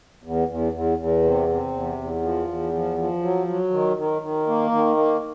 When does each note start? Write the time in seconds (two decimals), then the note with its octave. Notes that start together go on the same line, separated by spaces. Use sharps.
0.23 E2
0.48 E2
0.73 E2
0.98 E2
1.23 C3
1.48 C3
1.73 E2
1.97 E2
2.23 F3
2.47 E2
2.72 F3
2.98 F3
3.22 F#3
3.47 F#3
3.71 D#3
3.97 D#3
4.22 D#3
4.47 A#3
4.72 D#3
4.97 A#3